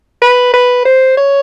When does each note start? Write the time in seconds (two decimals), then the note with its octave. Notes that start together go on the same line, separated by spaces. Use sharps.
0.22 B4
0.54 B4
0.85 C5
1.17 C#5